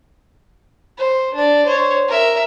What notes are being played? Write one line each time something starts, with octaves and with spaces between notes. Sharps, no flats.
C5
D4 D5
C5 C#5
A#4 E5